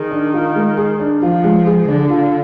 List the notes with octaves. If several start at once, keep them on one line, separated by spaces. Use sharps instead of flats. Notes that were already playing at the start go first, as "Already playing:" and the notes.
Already playing: D#3 G#4
D4
F4
G#3
G#4
D4
F3 F4
G#3
G#4
D3 D4
F4